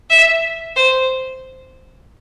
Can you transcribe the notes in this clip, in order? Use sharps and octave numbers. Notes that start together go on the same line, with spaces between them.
E5
C5